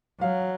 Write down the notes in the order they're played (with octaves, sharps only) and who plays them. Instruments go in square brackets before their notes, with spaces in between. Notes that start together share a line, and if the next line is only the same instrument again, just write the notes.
[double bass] F#3 [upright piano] F5